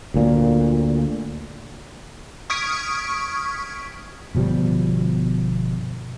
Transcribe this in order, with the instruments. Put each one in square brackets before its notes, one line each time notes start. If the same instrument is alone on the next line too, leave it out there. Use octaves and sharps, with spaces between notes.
[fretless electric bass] D2 A#2
[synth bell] C#6 D#6 F6 G#6 B6 D7
[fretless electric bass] G1 B2 F3 G3